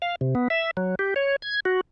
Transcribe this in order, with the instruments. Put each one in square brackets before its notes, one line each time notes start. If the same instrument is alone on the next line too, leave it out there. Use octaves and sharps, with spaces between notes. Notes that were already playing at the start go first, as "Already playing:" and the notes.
[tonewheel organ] F5
C3
B3
E5
F#3
G4
C#5
G#6
F#4